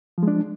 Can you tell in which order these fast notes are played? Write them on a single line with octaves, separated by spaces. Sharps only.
F3 G#3 D4